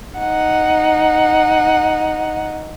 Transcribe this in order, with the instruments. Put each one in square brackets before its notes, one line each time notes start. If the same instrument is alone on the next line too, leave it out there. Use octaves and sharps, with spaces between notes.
[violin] D#4 F#5